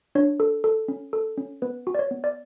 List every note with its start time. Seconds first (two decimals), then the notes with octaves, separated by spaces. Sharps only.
0.15 D4 C#5
0.40 A4
0.64 A4
0.88 C#4
1.13 A4
1.38 C#4
1.62 B3 B4
1.87 F#4
1.95 D5
1.99 C#5
2.11 B3
2.24 D5